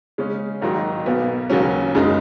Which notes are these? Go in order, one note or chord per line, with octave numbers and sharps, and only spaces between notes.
C#3 G#3 C#4
G#1 G#2 D#3 F#3 D#4
B1 B2 B3
D#2 C#3 F#3 C#4
F#1 F#2 C#3 G#3 D#4